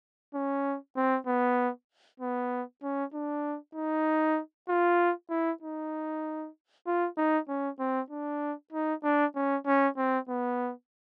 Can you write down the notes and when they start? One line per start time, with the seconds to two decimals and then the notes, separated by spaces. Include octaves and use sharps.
0.34 C#4
0.96 C4
1.27 B3
2.20 B3
2.83 C#4
3.14 D4
3.75 D#4
4.69 F4
5.30 E4
5.62 D#4
6.87 F4
7.17 D#4
7.48 C#4
7.79 C4
8.10 D4
8.72 D#4
9.04 D4
9.35 C#4
9.66 C#4
9.97 C4
10.29 B3